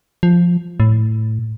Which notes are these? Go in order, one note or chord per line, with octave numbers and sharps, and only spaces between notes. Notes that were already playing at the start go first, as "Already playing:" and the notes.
F3
A2